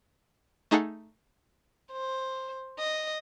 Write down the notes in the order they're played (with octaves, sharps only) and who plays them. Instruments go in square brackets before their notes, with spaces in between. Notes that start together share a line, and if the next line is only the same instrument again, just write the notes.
[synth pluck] A3 D#4 G#4 A4 F#5
[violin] C5
D#5